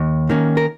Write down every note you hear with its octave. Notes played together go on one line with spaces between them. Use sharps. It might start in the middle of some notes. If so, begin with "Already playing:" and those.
Already playing: D#2
D#3 A#3 C#4
A#4